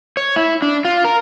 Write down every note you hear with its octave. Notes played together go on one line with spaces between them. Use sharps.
C#5
E4
D4
F4
A#4